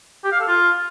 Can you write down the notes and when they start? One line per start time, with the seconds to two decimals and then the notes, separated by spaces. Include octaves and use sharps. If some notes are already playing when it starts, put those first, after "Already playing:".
0.24 G4
0.32 F5
0.40 A4
0.48 F4